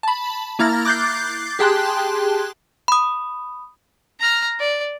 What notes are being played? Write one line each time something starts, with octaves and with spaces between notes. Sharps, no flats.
A5 B5
A#3 E4 A#5 F6 A6 A#6
D6 F#6 G6 A6 C7
G4 G#4 G5 A5 C6 F#6
B5 D#6
A#5 F6
D5